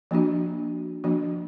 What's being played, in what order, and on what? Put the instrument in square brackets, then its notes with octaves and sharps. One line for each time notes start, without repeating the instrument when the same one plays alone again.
[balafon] F3 A#3 D4 F#4
F3 A#3 D4 F#4